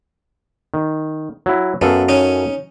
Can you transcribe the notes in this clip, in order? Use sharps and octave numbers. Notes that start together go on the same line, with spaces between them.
D#3
F#3 E4
F#2 B3 A4 F5
C#4 D#4